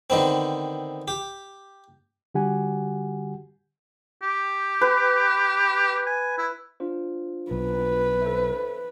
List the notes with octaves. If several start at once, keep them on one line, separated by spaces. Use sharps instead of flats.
D3 D#3 B3 C4
G4
D3 G3 F#4 G4 F#5 G#5
G4
B4
G#5
E4
D4 F4 C5
B1 B4
A4 C5 E5